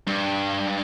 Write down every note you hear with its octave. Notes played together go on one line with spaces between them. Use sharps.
G2